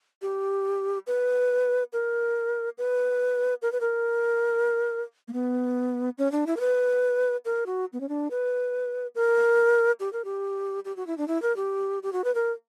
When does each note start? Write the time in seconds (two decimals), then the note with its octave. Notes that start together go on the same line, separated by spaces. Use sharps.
0.22 G4
1.07 B4
1.93 A#4
2.78 B4
3.62 A#4
3.72 B4
3.81 A#4
5.28 A#3
5.33 B3
6.18 C#4
6.32 D4
6.47 E4
6.57 A#4
6.60 B4
7.45 A#4
7.66 F#4
7.93 B3
8.01 C#4
8.09 D4
8.31 B4
9.15 A#4
10.00 G4
10.13 A#4
10.25 G4
10.85 G4
10.96 F#4
11.07 E4
11.18 D4
11.28 E4
11.42 A#4
11.56 G4
12.03 G4
12.13 F#4
12.24 B4
12.35 A#4